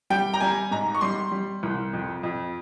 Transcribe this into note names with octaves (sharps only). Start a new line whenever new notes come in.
G3 G5
A#5
G3 G#5
G#2 A#5
C#6
G3 C6
G3
C2
F2
F2